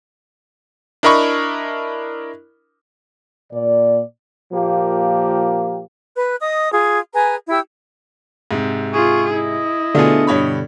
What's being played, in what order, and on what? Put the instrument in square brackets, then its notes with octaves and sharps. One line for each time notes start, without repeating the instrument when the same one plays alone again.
[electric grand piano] D4 E4 A#4 D#5 B5 C#6
[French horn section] A#2 D5
[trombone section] A#2 F3 A#3 G4
[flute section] B4 F#6
D#5 D#6
F4 G#4
G#4 B4 G#5 A#5
E4 G4 E6
[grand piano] G#2 C3
[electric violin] F4 G#4 [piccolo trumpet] C#6
[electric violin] E4 [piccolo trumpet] D#5
[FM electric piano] B2 D3 [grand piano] A3 F4 G#4
[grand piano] G2 C#5 B5